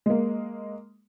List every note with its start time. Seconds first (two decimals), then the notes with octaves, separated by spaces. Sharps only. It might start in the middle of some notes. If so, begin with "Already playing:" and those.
0.06 G#3 A#3